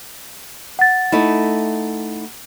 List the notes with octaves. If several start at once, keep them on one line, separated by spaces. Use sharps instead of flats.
F#5 A6
A3 D#4 E4